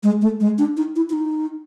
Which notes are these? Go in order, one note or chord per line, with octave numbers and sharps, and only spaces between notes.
G#3
A3
G#3
D4
D#4
E4
E4
D#4